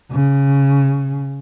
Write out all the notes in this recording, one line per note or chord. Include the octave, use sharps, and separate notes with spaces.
C#3